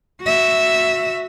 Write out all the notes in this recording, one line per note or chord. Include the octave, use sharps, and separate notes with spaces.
F#4 E5